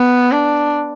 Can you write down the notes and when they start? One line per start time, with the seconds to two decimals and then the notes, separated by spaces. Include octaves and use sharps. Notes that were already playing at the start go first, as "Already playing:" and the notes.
Already playing: B3
0.31 D4